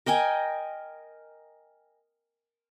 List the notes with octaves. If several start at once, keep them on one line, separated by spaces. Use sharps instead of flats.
A#4 D#5 G5 G#5